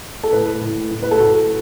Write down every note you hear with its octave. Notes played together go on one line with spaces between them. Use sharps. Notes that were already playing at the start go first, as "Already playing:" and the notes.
A4
A2 B4
A2
A2
B4
A4
A2 F#4